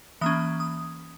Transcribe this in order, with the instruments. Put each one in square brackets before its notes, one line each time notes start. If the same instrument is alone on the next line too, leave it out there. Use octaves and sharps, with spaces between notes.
[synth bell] E3 A#3 C#4 D#6
D#6